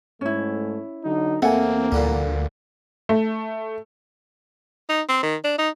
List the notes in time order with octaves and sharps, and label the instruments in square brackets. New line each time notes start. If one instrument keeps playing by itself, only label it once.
[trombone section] G#2 A3 [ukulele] C#4 E4
[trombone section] D3 F#3 D#4
[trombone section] E2 A#3 [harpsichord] A3 [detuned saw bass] C4 [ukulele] F#5 G#5
[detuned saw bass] D2 [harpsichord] A#2 D3 G3
[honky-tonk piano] A3
[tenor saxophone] D#4
C4
D#3
D4
D#4